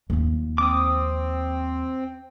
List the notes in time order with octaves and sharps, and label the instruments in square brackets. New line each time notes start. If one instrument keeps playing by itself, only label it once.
[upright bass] D#2 F3
[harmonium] C4 [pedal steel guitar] D6 D#6